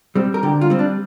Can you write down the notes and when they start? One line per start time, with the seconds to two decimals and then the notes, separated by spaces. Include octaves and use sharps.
0.15 G3 C4
0.34 A#4
0.43 D3 G4
0.61 F4
0.70 G3 C4
0.79 D4